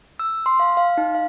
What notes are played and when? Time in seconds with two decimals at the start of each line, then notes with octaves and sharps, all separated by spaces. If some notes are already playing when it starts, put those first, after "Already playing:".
0.20 E6
0.46 C6
0.60 F5
0.77 F5
0.98 D#4
1.15 F5